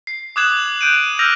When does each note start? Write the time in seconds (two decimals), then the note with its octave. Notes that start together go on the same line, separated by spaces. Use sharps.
0.07 C7
0.36 D6 D#6 F#6 G#6 E7 F#7
0.81 F#6 G6 D7 D#7
1.19 E6 F6 G6 A#6 D#7 F7